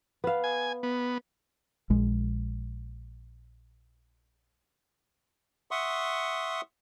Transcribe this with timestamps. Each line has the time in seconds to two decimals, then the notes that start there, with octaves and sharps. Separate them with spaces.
0.24 B3 F5
0.44 G#5
0.83 B3
1.90 A#1 G#3
5.71 E5 F#5 C6 C#6 D#6